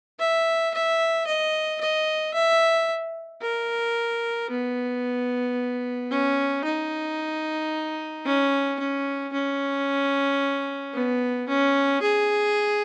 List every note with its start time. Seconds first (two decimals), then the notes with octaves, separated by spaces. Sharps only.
0.19 E5
0.74 E5
1.27 D#5
1.81 D#5
2.34 E5
3.41 A#4
4.50 B3
6.11 C#4
6.64 D#4
8.25 C#4
8.79 C#4
9.33 C#4
10.94 B3
11.48 C#4
12.02 G#4